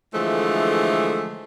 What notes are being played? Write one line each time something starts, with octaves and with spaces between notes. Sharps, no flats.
D3 E3 F3 G#3 A3